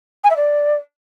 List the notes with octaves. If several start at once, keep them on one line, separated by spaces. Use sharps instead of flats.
G#5
E5
D5